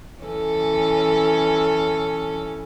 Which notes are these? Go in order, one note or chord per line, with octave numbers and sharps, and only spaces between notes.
E3 C#4 A4